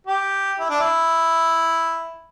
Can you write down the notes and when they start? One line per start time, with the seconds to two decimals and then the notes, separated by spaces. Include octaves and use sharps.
0.07 G4
0.59 E4
0.70 D4
0.80 E4